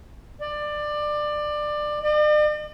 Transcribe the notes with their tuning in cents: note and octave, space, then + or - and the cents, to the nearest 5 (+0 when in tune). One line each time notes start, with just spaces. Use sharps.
D5 +20
D5 +45